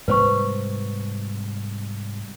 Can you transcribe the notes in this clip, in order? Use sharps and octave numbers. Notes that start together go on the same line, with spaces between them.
G#2 C3 G3 B4 C5 C#6